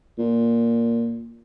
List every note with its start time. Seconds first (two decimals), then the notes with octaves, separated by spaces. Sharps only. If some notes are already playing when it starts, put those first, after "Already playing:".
0.18 A#2